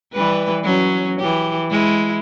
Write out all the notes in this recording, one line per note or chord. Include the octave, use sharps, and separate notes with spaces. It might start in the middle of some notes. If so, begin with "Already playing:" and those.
E3 G3 B4
F#3 C#4
E3 G4
G#3 E4